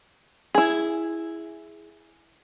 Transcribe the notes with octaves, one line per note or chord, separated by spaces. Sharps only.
E4 G#4